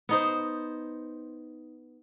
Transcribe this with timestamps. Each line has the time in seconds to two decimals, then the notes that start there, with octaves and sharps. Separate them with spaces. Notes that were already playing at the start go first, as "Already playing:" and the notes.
0.09 B3 D#4 C5